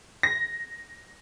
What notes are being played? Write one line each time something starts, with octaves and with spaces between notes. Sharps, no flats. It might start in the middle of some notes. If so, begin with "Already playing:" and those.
A#6